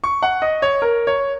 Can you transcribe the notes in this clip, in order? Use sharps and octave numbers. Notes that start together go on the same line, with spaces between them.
C#6
F#5
D#5
C#5
A#4
C#5